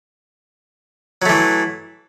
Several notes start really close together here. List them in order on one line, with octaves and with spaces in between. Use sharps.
F#3 A3 E3